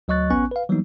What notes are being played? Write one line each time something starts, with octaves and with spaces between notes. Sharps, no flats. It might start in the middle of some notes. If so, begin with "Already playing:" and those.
D2 F#3 D#5 C#6 F#6 A6
A1 B3 C#4 G#5 C#6 F#6
B4 F5
E3 F#3 G3 A#3 B3 D#4